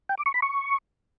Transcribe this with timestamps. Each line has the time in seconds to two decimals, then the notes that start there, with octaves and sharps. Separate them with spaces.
0.09 G5
0.18 D6
0.26 C#6
0.34 B5
0.42 C#6